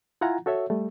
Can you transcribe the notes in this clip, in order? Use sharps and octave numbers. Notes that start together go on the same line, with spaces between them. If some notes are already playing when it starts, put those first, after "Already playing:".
E4 F4 F#5 G#5 A#5
F#4 A4 C#5 E5
G3 A3